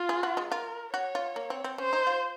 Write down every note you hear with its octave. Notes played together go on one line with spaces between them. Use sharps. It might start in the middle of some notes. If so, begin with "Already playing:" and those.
Already playing: F4
G#4
F#4
G#3
F4 A#4
F#4 C#5
F4
A#3
C4
C4
C#4 C5
D#4
F4